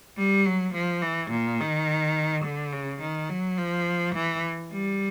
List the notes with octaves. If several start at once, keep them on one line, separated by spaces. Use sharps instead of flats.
G3
F#3
F3
E3
A#2
D#3
D3
C#3
D#3
F#3
F3
E3
G3